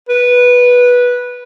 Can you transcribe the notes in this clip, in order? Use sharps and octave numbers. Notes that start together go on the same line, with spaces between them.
B4